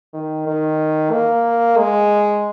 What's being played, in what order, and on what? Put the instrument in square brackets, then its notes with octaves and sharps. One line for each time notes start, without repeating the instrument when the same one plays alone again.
[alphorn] D#3
D#3
A#3
G#3